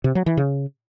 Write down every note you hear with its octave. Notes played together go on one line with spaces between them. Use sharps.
C3
F#3
E3
C#3